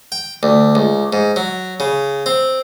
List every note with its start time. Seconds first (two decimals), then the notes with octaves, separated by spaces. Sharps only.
0.12 G5
0.43 D2
0.75 C#2
1.13 G#2
1.36 F#3
1.80 C#3
2.26 C4